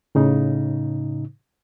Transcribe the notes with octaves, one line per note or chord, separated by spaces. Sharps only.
A2 C#3 D#4